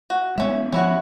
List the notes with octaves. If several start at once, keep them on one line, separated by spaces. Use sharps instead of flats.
F#4
G#3 B3 C#4 E5
F3 B3 C#4 E4 F#4